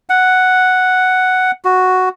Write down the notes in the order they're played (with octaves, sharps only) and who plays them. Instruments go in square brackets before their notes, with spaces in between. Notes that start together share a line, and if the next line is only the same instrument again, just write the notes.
[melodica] F#5
F#4